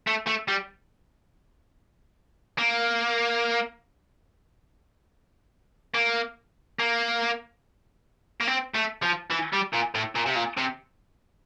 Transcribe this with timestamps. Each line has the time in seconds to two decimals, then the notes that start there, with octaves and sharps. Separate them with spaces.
0.07 A3
0.27 A3
0.48 G3
2.58 A#3
5.94 A#3
6.79 A#3
8.41 A#3
8.48 C4
8.75 A3
9.03 F3
9.31 E3
9.53 G3
9.73 A#2
9.95 A2
10.16 A#2
10.26 C3
10.36 A#2
10.58 C3